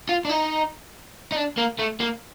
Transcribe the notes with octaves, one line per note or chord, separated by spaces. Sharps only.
F4
D4
D#4
D#4
D4
A#3
A3
A#3